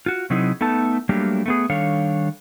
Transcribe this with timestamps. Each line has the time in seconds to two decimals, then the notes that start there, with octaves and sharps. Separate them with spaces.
0.06 F4 F#4
0.30 C3 F#3 C4 D#4 E4 G#4
0.61 A3 B3 D#4 A4 A5
1.09 F#3 G3 A3 A#3 D4 G4
1.46 A3 B3 G#4
1.70 D#3 G3 D4 A4 C#5 F5